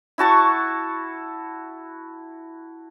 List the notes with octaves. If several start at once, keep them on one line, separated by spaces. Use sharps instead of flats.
E4 F#4 A5 C#6